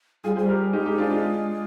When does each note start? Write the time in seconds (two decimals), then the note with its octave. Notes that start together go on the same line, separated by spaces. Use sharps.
0.24 G3 F4 G#4
0.36 G3 G#4 C5
0.48 G4 A#4
0.73 G#3 D#4 G4
0.86 D#4 G4
0.98 D4 F4
1.10 D4 F4